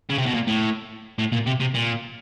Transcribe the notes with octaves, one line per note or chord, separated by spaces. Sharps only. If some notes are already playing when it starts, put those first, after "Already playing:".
C#3
C3
B2
A#2
A2
A2
A#2
C3
C3
A#2